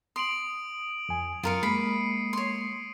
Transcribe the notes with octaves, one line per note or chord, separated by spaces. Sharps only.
C6 D#6 D7 F#7
F2 G#5
F#2 F4 A#4 F5 C#7 D#7
G#3 A#3 B5 C7
C#5 C6